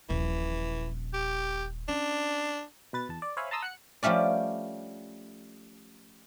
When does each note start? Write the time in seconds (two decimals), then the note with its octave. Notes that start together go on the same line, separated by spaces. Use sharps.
0.09 D#1 A#1 E3
1.14 G4
1.88 C#4 D4
2.93 B2 B4 A6
3.09 E2 A5
3.22 D5
3.37 C5 C#5 E5 F5 G#5 B5
3.51 A5 A#5 C6 D#6 E6
3.62 F#5 F#6 C#7
4.03 F3 G3 A3 C#4 D5